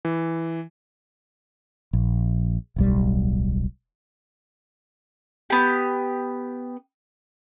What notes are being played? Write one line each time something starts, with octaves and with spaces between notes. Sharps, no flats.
E3
A#1
D1 B1 G3
B3 G4